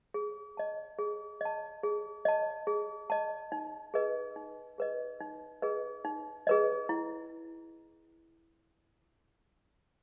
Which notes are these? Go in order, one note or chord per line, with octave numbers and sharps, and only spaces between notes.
G#4
D#5 A5
G#4
D#5 A5
G#4
D#5 A5
G#4
D#5 A5
D#4
G#4 B4 D#5
D#4
G#4 B4 D#5
D#4
G#4 B4 D#5
D#4
G#4 B4 D#5
E4